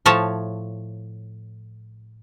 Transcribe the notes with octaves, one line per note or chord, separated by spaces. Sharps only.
A2 F3 C#5 A5